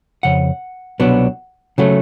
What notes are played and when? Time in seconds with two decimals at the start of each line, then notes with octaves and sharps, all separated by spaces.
0.23 F2 C#3 F#5
1.00 C2 B2 F#3 B3 D4
1.78 C#3 F#3 A3